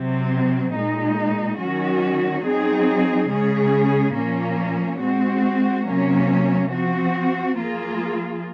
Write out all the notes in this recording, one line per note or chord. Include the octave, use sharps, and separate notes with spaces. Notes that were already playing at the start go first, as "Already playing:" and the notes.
Already playing: C3 F#3 C4
A#2 G#3 D#4
D#3 F#3 C#4 F#4
F#3 C4 D#4 G#4
C#3 G#3 C#4 G#4
A#2 F3 A#3 C#4
G#3 C4 F#4
C3 F#3 A#3 C#4
F3 C4 F#4
F3 A#3 F4 G#4